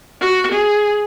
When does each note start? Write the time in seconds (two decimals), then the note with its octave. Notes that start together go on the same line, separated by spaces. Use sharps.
0.21 F#4
0.52 G#4